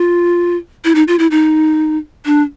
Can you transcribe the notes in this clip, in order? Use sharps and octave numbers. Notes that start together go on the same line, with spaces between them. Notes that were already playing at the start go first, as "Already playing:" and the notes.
Already playing: F4
E4
D#4
F4
E4
D#4
D4